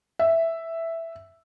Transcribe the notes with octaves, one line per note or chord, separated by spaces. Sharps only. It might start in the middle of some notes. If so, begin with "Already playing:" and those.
E5